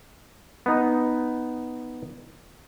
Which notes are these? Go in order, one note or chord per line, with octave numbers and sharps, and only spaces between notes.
B3 D#4